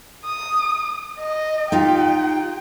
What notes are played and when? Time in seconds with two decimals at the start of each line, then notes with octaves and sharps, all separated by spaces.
0.25 D#6
1.19 D#5
1.72 D#4 F4 G4 G5